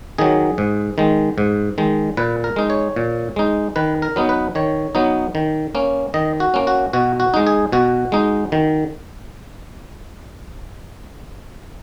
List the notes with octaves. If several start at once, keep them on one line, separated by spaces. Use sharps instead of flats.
D#3 F#3 G#4
G#2
D#3 G#3
G#2
D#3 G#3
A#2 B4
A#4
G#3 D#4
C#5
A#2
G#3 D#4
D#3 B4
A#4
F#3 B3 D#4
B4
D#3 C#5
F#3 B3 D#4
D#3
A#3 C#4
D#3 D#5
F#4
A#3 C#4
F#4
B2 F#4
F#4
G#3 D#4
G#4
B2 F#4
G#3 D#4
D#3